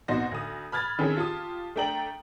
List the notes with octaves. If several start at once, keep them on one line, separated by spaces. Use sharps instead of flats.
C2 B2 D#4 F#4 C5 A#6
D2 D#6
B5 F6 G#6 A6
D#3 C4 C#4 E4 G#4 A4
F4 G4 A5 D#6
A3 D4 G5 A#5 F#7